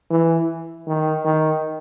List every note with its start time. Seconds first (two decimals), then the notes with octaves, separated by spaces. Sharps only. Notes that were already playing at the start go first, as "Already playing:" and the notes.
0.10 E3
0.87 D#3
1.24 D#3